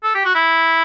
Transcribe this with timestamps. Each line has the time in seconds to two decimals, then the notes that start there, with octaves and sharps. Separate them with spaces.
0.03 A4
0.15 G4
0.25 F#4
0.35 E4